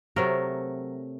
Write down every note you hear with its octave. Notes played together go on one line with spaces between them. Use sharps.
C3 F#3 A3 A#4